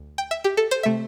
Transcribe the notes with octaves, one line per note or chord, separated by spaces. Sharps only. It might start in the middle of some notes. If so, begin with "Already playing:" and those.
Already playing: D2
G5
E5
G4
A4
C5
C3 A3 E5